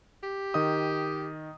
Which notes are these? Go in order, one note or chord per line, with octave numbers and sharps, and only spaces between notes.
G4
D#3 D#5 D#6